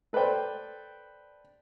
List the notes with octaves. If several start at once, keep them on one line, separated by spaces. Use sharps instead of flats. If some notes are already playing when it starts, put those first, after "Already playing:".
A4 B4 C5 D5 G5